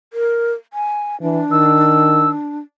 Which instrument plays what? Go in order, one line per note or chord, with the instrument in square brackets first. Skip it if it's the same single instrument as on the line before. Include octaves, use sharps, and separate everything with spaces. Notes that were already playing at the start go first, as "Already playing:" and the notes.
[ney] A#4
G#5
[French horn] E3 [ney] D4
[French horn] D#3 [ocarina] E6